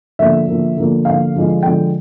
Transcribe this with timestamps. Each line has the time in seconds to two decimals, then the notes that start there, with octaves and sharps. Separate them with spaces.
0.19 D3 F3 A#3 E5
0.48 D3 F3 A#3
0.76 D3 F3 A#3
1.05 D3 F3 A#3 F5
1.35 D3 F3 G#3
1.63 D3 F3 G#3 G5